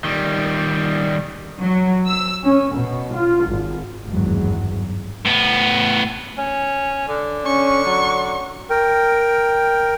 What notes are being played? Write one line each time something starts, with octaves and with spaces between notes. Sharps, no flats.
D#3 G3
F#3
E6
C#4
B2
F4
G#1
G#1 E2 G2 F#3
A2 B3
C#4
D3
C#4 C#6
F#3
A#4 G5